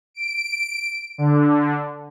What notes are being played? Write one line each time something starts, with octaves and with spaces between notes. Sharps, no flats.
D7
D3